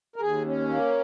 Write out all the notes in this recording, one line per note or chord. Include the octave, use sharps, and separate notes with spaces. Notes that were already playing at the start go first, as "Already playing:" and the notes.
A#4
D#2 G#4
C#4
A#3